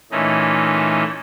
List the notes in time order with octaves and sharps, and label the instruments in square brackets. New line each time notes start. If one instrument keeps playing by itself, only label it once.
[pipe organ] A#2 E3 A3 C#4 D#4